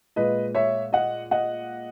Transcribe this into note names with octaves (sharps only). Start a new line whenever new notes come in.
A#2 G#3 B4 D#5
C#5 E5
D#5 F#5
D#5 F#5